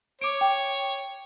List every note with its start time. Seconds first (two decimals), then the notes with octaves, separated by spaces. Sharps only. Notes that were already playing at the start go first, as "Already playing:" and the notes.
0.21 C#5 D6 D7
0.41 G5